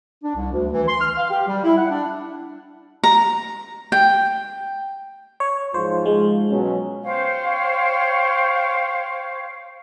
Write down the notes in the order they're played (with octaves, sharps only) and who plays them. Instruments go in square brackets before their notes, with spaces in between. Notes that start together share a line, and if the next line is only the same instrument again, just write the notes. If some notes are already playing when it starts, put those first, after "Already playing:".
[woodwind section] D4
C2
D2
E3
C6
F6
F5
G4
G3
E4
F#5
D4
[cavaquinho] A#5
G5
[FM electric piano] C#5
[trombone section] G#2 F3 F4 [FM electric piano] C5
[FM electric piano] G#3
[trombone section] B2 F#3 C#4
[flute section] C5 C#5 F5 G5